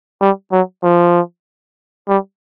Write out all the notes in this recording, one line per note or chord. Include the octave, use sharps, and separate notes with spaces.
G3
F#3
F3
G3